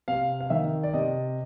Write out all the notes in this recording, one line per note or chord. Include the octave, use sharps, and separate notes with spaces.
C3 F5
F5
D#3 E5
D5
C3 D#5